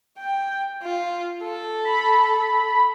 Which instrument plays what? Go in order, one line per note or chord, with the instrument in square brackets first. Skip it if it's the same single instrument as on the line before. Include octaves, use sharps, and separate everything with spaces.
[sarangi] G5
F4
A4
[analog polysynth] B5